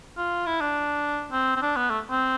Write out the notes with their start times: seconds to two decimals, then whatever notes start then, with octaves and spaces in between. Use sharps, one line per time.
0.17 F4
0.46 E4
0.61 D4
1.32 C4
1.56 C4
1.62 D4
1.77 B3
1.90 A3
2.10 C4